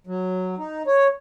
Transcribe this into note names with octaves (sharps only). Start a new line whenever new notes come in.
F#3
D#4
C#5